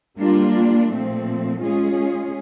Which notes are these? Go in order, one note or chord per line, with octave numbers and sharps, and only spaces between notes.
G3 A#3 D4 F4
A#2 F3 A3 C4
G#3 C#4 F4 G#4